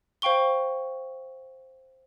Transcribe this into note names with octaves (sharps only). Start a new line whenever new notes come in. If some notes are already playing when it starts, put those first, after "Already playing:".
C5 F5 G5 C#6 G7